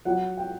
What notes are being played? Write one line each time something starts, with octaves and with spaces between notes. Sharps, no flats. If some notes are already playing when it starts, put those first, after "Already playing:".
F#3 F#5
G5